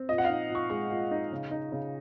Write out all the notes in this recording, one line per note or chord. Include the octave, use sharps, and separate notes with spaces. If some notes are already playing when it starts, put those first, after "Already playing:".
Already playing: C4
A#2 D#5
F#5
D#4 F5
A#2
C#6
G#3 C#6
A#2
D#4
C#3
D#4
C#3